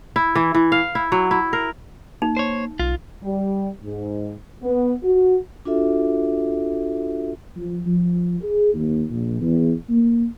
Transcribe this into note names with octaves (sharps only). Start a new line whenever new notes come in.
E4
E3
E3
F5
E4
F#3
E4
A#4
A#3 D#4
C5 C#5
B1 F4
G3
G#2
B3
F#4
D4 F4 F#4 A4 E5
F3
F3
G#4
D#2
A#1
E2
A#3